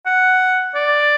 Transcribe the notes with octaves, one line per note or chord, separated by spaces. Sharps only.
F#5
D5